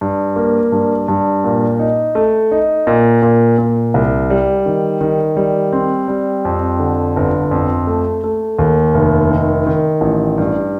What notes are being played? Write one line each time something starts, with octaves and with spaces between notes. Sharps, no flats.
G2
A#3
G2
G2
A#2
D#4
A3
D#4
A#2
A#2
A#2
C2
G3
D#3
D#3
G3
C4
G3
F2
D3
G1
F2
A3
A3
D#2
F1
D#3
D#3
A1
G2